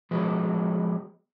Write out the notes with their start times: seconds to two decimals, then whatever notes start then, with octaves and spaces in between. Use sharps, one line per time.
0.11 F3 F#3 G#3 B3